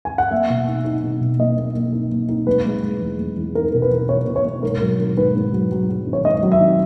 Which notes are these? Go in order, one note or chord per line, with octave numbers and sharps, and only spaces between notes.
G#5
F#5
A#3 E5
B2
D#4
D#4
B2
B2
A#3 D#5
A#3
A#3
D#4
A#3
D#4
G#3 B4
G#3
G#3
E2
G#3
E2
D#4 A#4
B2
B4
E2
B2 C#5
B2
C#5
B2
G#2 A#4
F#3
D#3
G#2 B4
G#2
F#3
F#3
F#3
D#3
C#5
G#2 D#5
F#3
E5
D#3